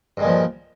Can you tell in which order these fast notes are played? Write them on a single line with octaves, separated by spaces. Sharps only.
G2 G#3 A#2 F3